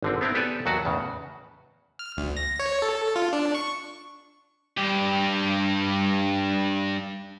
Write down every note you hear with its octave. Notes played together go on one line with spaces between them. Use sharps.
G#1 D3 C4
B3 C4 E4 A#4
B3 G4 A4 B4 D5 G#5
D#2 F#3 F#4 A5
E2 A2 C#3
F6
D2
A#6
C#5
A4
F4
D4
C#6
G2 G4